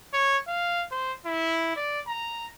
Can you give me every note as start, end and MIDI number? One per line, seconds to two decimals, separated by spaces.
0.13 0.37 73
0.48 0.85 77
0.91 1.13 72
1.26 1.74 64
1.76 2.00 74
2.07 2.49 82